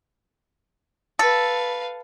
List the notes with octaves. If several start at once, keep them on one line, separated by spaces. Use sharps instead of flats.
A4 B4 F5